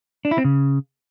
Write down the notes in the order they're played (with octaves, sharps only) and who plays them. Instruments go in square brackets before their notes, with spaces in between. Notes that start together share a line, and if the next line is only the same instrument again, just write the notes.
[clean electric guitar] D4
E4
C4
C#3